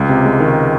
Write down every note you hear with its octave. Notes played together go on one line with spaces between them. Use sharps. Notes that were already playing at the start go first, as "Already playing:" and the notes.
Already playing: C#2
C3
G#3
D#3